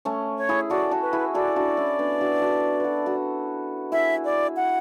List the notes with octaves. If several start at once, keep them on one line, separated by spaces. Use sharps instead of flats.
A3 C#4
C#5
E4 G#4
F#4 A4 D5
F#4 A4
B4
E4 G#4
F#4 A4 D5
D4 F#4
C#4 E4
B3 D4
D4 F#4
F#4 A4
F#4 A4 B4
F#4 A4
E4 G#4 E5
D5
F#5